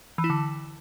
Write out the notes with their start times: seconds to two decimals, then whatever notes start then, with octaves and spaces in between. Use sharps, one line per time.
0.18 E3
0.24 E4
0.30 D3